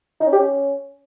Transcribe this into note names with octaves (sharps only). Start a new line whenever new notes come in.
D#4
C#4
G4
C#4